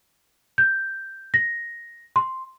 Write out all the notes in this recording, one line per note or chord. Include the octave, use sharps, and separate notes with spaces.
G6
A#6
C6